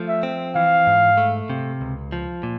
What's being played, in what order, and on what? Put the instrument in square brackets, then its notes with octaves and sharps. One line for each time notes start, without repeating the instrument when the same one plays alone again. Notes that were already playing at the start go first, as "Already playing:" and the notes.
Already playing: [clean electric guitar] F3 A3
[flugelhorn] E5
[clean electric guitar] C4
[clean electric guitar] E3 [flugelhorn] F5
[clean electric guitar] G#2
A3
C3
C#2
F3
A#2